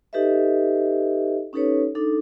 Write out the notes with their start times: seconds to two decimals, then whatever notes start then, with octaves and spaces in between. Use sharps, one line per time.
0.13 D#4 G4 A4 B4 D#5 E5
1.53 C#4 D#4 G4 A4 B4 C#5
1.95 D4 D#4 A4